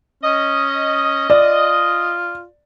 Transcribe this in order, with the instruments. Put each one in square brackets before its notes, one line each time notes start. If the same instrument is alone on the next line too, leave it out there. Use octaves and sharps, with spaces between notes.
[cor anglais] C#4 [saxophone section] D#5
[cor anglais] F4 [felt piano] D5